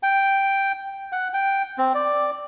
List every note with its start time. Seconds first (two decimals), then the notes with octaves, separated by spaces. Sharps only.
0.03 G5
1.12 F#5
1.34 G5
1.78 C4
1.95 D5